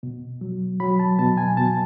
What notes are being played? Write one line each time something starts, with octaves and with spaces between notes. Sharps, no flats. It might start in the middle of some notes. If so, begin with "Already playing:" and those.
B2
F#3
F#3 B5
A5
B2 A5
G#5
B2 A5